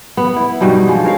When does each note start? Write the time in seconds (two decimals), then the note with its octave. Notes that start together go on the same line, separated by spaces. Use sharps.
0.17 B3
0.36 E4
0.61 G2 B2 G3 D#4
0.87 F3 G#3
1.05 A#4 C#5 F5